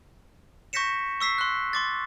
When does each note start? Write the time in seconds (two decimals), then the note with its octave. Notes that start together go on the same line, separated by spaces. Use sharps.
0.73 C#6 G6 A#6 B6 C#7 E7
1.21 C#6 E6 B6 C7
1.38 C6 F#6
1.73 C6 D6 A6